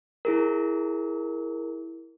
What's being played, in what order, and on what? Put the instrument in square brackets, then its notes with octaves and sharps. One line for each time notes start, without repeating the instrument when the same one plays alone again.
[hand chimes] E4 G#4 A#4